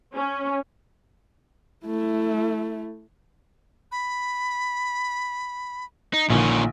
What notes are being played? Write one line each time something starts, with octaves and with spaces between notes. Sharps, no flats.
C#4
A3 E4
B5
D#4
A#1 A#2 D3 D#3 C#4